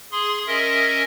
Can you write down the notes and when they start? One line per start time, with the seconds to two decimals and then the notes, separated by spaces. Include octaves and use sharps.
0.12 G#4 C6
0.47 C#4 A#4 D#5 E5